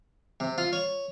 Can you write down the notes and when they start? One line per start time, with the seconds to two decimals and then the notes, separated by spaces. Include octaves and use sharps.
0.40 C3
0.58 F4
0.73 C#5